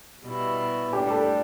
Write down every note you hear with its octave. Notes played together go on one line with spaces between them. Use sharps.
B2 G3 B3 E4
A2 G3 D4 G4
A4